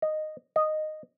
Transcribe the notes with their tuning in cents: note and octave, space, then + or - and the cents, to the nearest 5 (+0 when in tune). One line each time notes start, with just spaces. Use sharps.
D#5 -10
D#5 -10